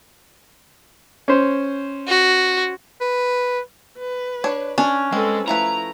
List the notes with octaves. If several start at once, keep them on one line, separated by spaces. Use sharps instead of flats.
C#4 C5
F#4
B4
B4
D4 C#5
C#4 D4
G#3 C4 A4 B4
F3 A3 E4 B4 A#5